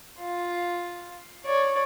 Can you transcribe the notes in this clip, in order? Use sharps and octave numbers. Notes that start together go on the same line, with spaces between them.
F4
C#5 D5